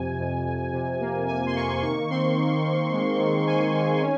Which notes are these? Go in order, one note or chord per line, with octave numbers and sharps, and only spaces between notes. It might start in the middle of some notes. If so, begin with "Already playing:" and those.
Already playing: F2 C3 G#5
F2
F2
C3
A#3
C3 G#5
C6
A#3 C#6
D#3 C#6
C4 C6
D#3
D#3
G#3
D#3
D#3 G#5
D#3
C#4